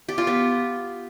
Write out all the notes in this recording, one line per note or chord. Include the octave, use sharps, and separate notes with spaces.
G4
F4
B3